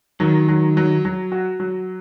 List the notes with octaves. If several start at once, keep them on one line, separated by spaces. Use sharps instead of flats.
D#3 F#3
F#3
F#3
F#3
F#4
F#3